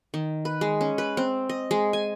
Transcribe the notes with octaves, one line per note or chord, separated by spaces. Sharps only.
D#3
B4
G#3
C#4
B4
C4
D#5
G#3
G#5